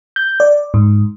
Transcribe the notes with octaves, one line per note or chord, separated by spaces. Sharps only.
G6
D5
G#2